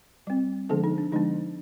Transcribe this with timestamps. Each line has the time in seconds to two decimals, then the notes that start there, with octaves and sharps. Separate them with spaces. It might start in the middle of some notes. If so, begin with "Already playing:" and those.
0.27 G3 C4
0.69 D3 F3 G#3 B3 D4 A4
0.84 D#4
0.98 D4
1.12 D3 F3 G#3 B3 D4 D#4